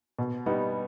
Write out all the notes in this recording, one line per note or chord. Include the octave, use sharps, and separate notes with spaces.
B2
G3 B3 D#4